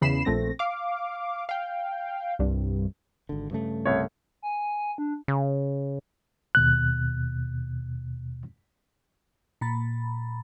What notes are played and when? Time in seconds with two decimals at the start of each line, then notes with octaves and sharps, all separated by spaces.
0.01 E2 C#3 B5 C7 E7
0.25 A#1 A3 C4 A#6
0.59 F5 D6
1.49 F5 G5
2.39 C2 G2
3.29 G#1 D3
3.51 G2 C#3 A3
3.85 C2 C#5
4.42 G#5
4.98 D4
5.28 C#3
6.55 D#2 B2 F#6
9.61 A#2 A#5 B5 A6